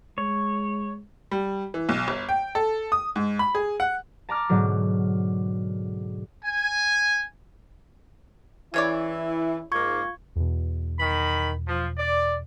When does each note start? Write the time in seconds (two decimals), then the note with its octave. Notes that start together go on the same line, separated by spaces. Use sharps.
0.18 G#3 C#5
1.31 G3
1.74 E3
1.89 B1
2.08 G1
2.29 G5
2.55 A4
2.92 D#6
3.16 G#2
3.39 B5
3.55 G#4
3.80 F#5
4.29 A5 A#5 D6 F6 A6
4.49 G#2 B2 D3 F#3
6.44 G#5
8.74 C#3 E3 E4 C#5 D5
9.72 G#2 A#3 F4 C#6 G#6
10.36 E2 B2
10.99 D#3 B5
11.68 F3
11.98 D5